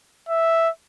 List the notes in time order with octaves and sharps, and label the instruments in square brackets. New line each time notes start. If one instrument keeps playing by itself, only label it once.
[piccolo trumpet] E5